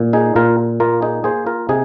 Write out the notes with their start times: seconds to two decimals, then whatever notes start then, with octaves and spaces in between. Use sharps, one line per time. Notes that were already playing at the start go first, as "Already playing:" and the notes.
Already playing: A#2
0.13 D#4 G#4
0.36 A#2 F4 A#4
0.80 A#3 F4 A#4
1.02 D#4 G#4
1.24 A#3 G#4 C5
1.46 F4 A#4
1.69 C3 D#4 G#4